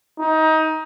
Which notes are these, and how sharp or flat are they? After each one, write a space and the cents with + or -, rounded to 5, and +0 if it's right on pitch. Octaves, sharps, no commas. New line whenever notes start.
D#4 +20